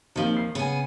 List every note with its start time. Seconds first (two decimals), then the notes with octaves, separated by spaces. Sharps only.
0.16 D#2 D#3 F3 C4 G7
0.37 C7
0.55 C#3 B3 G#5